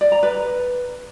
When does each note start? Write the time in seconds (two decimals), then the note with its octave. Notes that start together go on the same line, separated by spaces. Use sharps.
0.01 D5
0.12 A#5
0.23 B4